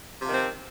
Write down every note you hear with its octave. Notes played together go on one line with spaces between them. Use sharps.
C3 D#3 F3 C4